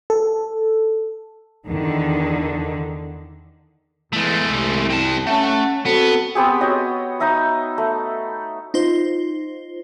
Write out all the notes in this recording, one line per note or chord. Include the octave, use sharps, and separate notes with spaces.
A4
E2 D3 D#3
E2 G#3 A3
C2
C4 A5
A3 C#4 F#5 A5
B3 C4 F#4 A4
B3 C4 G4 G#4
F#4 C#5 D#5 G5
D#4 D#5 E5 D#6
A3
D#4 F4 C5